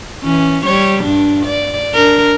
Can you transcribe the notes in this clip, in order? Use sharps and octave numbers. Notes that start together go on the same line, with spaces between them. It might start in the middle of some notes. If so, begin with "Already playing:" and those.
E3 C#4
G3 C#5
G2 D4
D5
D4 A#4